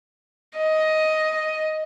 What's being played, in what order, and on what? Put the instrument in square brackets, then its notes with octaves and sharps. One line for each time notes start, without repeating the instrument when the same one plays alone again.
[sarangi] D#5